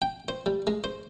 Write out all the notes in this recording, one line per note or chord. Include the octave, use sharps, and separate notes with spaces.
G5
C5
G3
G#3
C5